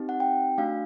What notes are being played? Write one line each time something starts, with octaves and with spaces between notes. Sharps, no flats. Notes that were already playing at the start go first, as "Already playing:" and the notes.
Already playing: C4 D#4 G4
F#5
G5
A3 D4 F#4 F5